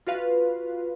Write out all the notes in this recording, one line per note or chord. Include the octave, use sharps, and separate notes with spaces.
F4 F#4 B4 F5